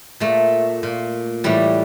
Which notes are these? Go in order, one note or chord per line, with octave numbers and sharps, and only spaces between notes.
A#2 A3
A#2
A2 E3 G3